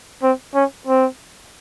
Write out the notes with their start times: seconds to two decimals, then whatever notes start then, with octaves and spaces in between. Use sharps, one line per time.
0.23 C4
0.55 C#4
0.87 C4